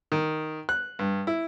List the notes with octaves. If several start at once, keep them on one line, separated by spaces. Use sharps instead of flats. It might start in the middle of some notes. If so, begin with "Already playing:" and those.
D#3
F#6
G2
E4